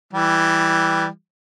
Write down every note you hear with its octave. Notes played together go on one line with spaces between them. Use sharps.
E3 G3